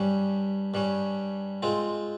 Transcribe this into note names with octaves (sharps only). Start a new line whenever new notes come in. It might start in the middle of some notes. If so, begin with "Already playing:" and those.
Already playing: G2 G3 C#4
G2 G3 C#4
G#3 C4 F4